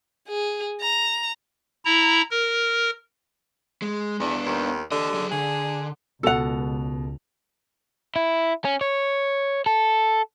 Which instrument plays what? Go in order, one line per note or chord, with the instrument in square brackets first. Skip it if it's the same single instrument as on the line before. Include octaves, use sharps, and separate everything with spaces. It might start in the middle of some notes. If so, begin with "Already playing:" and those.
[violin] G#4
A#5
[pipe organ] E4 A#5
A#4
[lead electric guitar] G#3
[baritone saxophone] E2 [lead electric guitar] B3 D4
[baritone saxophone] D#2
[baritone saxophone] D3 [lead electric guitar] G4 D#5
[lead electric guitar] F#3 G#4
[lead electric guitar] D3 [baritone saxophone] G#4
[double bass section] C#2 [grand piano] B2 F7 [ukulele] A4 F#5
[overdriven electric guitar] E4
C#4
C#5
A4